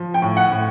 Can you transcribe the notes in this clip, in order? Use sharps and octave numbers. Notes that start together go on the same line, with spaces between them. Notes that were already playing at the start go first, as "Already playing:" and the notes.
Already playing: F3
G5
A2
F#5
A2